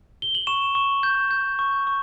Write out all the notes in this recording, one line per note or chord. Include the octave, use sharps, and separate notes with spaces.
G7
F#7
C#6 E7
C#6
G6
G6
C#6
C#6